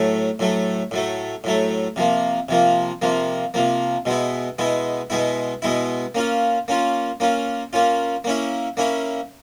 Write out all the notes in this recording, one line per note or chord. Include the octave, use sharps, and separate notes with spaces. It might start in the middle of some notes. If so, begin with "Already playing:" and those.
Already playing: A2 F#3 A3
A2 F#3 A3
A2 F#3 A3
A2 F#3 A3
C3 F3 A#3
C3 F3 A#3
C3 F3 A#3
C3 F3 A#3
B2 G#3 B3 E4
B2 G#3 B3 E4
B2 G#3 B3 E4
B2 G#3 B3 E4
A#3 C#4 F4
A#3 C#4 F4
A#3 C#4 F4
A#3 C#4 F4
A#3 C#4 E4
A#3 C#4 E4